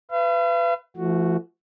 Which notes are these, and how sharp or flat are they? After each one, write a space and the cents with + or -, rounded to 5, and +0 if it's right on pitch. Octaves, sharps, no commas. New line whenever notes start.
B4 +20 F5 -45
F3 -45 A3 +0 F#4 +0